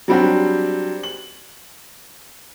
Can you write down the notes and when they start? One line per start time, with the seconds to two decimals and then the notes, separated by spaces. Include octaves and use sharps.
0.08 F#3 G3 C4 D4 F#4 G4
1.03 F#7